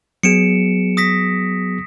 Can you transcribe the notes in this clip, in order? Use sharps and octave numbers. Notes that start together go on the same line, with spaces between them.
F#3 B3 G#4 C#7 D7 E7
D#6 A#6 B6